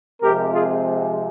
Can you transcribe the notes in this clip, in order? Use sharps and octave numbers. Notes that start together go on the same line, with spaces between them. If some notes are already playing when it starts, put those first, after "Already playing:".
C3 F3 G#3 C4 G4 A#4
F4 G#4